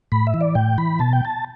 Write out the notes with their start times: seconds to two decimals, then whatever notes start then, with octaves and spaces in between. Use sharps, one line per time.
0.12 A2 B5
0.27 E5
0.34 E3
0.41 D5
0.55 A2 G5
0.78 E3 B5
0.99 B2 A5
1.13 G5
1.25 A5